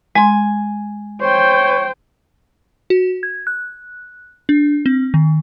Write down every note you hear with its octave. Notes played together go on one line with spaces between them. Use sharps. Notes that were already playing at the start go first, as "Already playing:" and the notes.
G#3 G#5 C6
C5 C#5 G5
F#4
G#6
F#6
D4
C4
D#3